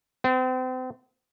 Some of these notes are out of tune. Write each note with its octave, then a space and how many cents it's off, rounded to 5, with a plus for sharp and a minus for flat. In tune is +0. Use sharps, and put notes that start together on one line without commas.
C4 -35